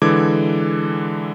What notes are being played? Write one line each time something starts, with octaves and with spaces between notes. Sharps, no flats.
D3 E3 G#3 A4 D6 G#6